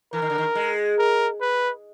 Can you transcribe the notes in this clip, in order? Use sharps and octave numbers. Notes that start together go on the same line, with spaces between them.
E3 A#4
D#3
D3
D#3
G#3
A#4
B4